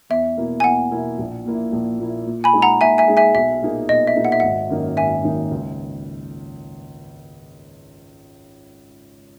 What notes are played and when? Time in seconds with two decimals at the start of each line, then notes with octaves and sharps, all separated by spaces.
0.10 E2 E5
0.37 B2 A#3 E4
0.60 G#5
0.64 E2 F#5
0.92 B2 A#3 E4
1.19 A#1
1.45 A#2 A#3 E4
1.73 A#1
1.99 A#2 A#3 E4
2.26 A#2
2.44 G#5 B5
2.53 G#3 D#4 G#4
2.62 F#5 A#5
2.81 A#2 E5 G#5
2.98 E5 G#5
3.08 G#3 D#4 G#4
3.17 E5 G#5
3.35 B1 E5
3.62 A#2 A#3 D#4 G#4
3.89 B1 D#5
4.07 E5
4.16 A#2 A#3 D#4 G#4
4.25 F#5
4.32 E5
4.40 G#1 F#5
4.70 F#2 D#3 A#3 D#4
4.97 G#1 E5 G#5
5.24 F#2 D#3 A#3 D#4
5.51 C#2